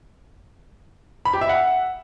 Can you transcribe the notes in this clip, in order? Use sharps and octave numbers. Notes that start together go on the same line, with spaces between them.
B5
G4
E5
F#5